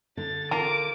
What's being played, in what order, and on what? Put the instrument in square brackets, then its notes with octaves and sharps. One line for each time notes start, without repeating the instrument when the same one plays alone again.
[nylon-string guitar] D3 [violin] A6
[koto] F4 A#4 [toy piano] A5 [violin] D6